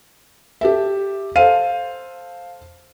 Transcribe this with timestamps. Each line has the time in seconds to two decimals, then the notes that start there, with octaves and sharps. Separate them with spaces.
0.61 G4 A4 E5
1.36 A4 C5 F5 D#7